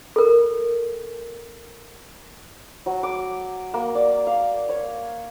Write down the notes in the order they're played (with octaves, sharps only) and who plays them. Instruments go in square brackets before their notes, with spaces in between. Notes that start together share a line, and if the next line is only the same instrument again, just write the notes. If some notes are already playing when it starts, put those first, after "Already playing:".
[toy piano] A4 A#4
[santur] F#3
D6
A#3
D5
F5
C#5